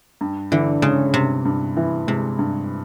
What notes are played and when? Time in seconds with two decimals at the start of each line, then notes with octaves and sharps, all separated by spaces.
0.21 G2
0.52 D3 E3
0.82 C#3 G#3
1.14 G2 C3
1.45 G2
1.77 E3
2.07 C3 G#3
2.39 G2